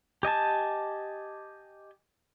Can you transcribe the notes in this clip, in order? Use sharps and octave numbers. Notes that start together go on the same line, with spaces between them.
G4 D#5 G#5 A5